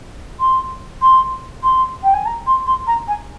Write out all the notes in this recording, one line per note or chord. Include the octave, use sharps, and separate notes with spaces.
C6
C6
C6
G5
G#5
A#5
C6
C6
A#5
G#5